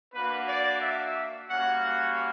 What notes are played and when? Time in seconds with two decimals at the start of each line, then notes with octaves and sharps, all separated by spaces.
0.13 A#3 D4 F#4 B4
0.48 D5
0.81 E5
1.49 G3 A#3 C#4 F#4 F#5
1.83 F#5